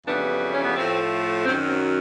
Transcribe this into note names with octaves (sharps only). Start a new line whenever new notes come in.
F2 C#3 E3 G3 B3 D4
C#4
B3
A2 F3 A3 C4
F#2 D#3 F#3 C4
C4